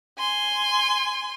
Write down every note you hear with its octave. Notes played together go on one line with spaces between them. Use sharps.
G#5 C6